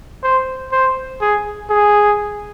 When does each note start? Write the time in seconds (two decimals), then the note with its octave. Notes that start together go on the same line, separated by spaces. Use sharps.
0.23 C5
0.72 C5
1.21 G#4
1.70 G#4